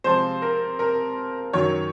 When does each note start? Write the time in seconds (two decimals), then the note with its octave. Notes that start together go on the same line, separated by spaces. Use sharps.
0.04 C3 F3 G#3 C5
0.42 A#4
0.79 A#4
1.53 F#2 D#3 F#3 C#5